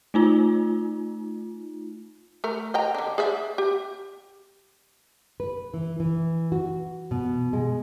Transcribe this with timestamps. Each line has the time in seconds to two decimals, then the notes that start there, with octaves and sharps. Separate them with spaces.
0.14 A3 D#4 F4
2.44 A3 A#4
2.74 D#5 G5 A#5
2.95 D3 D4
3.18 G#4 D5 E5
3.58 G4
5.40 B4
5.74 E3
6.00 E3
6.52 F#4
7.11 B2
7.53 G#3